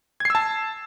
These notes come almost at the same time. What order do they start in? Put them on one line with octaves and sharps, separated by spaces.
G#6 C7 E6 A5